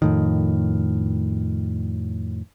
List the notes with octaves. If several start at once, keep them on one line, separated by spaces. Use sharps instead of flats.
F2 A2 D#3